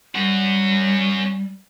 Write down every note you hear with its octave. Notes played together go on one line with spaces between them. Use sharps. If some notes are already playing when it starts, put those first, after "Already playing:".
G3 C#4 F#4